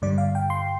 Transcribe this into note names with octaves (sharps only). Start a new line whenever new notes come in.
G2 D3 G3 D5
F5
G5
C6